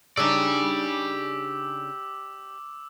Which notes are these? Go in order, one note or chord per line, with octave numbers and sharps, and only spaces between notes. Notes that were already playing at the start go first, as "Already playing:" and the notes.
C#3 D4 D#4 G4 D5 D6 E6